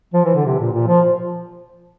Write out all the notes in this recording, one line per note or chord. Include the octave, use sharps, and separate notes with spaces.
F3
E3
D3
C3
A#2
A#2
F3